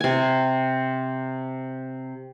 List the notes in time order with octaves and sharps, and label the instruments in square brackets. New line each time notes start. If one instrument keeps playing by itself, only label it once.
[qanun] C3 G#5